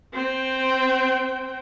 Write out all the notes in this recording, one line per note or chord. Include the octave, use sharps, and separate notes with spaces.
C4 G5